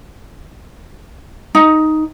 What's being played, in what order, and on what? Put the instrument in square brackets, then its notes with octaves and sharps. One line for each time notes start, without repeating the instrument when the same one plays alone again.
[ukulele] D#4